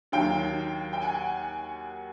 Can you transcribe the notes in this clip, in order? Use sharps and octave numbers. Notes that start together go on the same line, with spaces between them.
D#2 D#3 F#3 F5 G5
G5
F#5 G#5